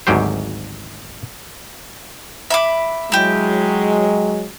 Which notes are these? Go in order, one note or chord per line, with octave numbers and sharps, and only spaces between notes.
G#1 D2 G#2 F#3 G4 C5
E5 B5 D6
F#3 G#3 E4 G4